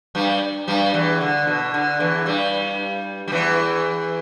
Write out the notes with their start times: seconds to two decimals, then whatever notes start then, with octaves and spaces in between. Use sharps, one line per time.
0.15 G2 G3
0.68 G2 G3
0.94 E2 E3
1.21 D3
1.47 B2
1.74 D3
2.00 E2 E3
2.26 G2 G3
3.28 G3
3.32 E2 E3